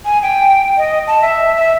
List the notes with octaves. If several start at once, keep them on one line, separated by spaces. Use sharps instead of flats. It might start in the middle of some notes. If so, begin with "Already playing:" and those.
G#5
G5
D#5
A5
E5
E5